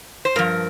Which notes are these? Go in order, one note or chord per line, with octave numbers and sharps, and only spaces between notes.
C5
G2 F3 A#4